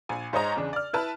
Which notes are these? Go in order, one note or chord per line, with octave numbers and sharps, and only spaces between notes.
A#1 G#5
G#2 C5 C#5 D#5 A#5
E2 C#3 D4
D5 F6
E4 B4 A5